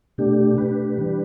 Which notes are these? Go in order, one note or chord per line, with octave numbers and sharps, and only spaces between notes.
B2 A3 D4 G4
B2 A3 D4 G4 B4
E3 G3 D4